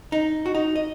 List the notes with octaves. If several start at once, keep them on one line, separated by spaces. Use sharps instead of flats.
D#4
F#4
D#4
D#5